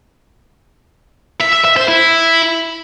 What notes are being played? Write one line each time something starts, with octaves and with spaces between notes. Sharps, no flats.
E5
E5
E5
C5
E4